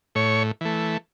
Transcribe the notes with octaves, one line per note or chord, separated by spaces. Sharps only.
A2 C#5
E3 A3